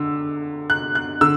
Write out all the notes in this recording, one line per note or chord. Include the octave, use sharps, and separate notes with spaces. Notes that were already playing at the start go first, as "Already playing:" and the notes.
Already playing: D3 E6
F#6
F#6
D3 E6